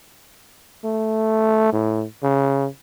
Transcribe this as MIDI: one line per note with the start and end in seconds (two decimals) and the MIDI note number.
0.84 1.69 57
1.73 2.04 45
2.23 2.67 49